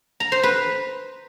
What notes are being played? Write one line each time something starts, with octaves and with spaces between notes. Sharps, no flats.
A#5
C5
B4